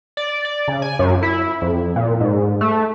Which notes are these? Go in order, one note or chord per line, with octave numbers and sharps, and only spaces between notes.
D5
D5
C#3
G#5
F#2
E4
F2
A#2
G#2
A3